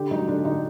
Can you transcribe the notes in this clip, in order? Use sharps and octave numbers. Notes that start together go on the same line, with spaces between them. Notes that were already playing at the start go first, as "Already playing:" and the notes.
Already playing: D3 G4
F#3 D#4
D3 D4
D3 D#4